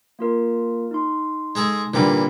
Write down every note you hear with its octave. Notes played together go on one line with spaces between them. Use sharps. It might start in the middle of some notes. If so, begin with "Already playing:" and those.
A#3 F4 A#4
D#4 C6
G#3 G#4 A4
A#2 D3 E3 G3 D6